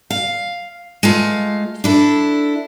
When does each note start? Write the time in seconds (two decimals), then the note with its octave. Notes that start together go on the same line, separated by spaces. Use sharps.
0.10 F5
1.03 G#3 A3 F4
1.84 D4 E4 A4